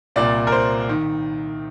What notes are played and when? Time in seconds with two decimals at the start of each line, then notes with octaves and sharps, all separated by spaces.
0.16 C2 A#2 D5
0.47 A#4
0.52 C5
0.89 D#3